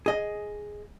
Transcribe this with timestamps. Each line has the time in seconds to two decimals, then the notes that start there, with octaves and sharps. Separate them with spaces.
0.06 G#4 D#5